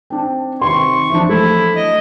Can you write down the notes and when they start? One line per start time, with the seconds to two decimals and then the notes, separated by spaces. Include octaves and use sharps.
0.10 C4 D4
0.61 C3 D#3 C6 C#6
1.10 E3 F3 D4
1.29 A3 E4
1.76 F#3 D#5